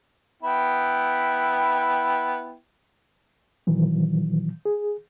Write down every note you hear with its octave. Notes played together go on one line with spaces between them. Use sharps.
B3 E4 G5
A#2 D#3 E3 F#3
G#4